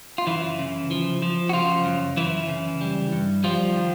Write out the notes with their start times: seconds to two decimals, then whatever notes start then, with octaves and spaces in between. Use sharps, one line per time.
0.18 F4
0.27 F#2 E3 E4
0.59 C#3
0.91 F3
1.22 F3
1.49 F#4
1.53 C#3 F3 F4
1.85 F#2
2.17 F#2 E3 E4
2.48 C#3
2.81 G3
3.12 G2
3.44 F3 G3 F4
3.76 D#3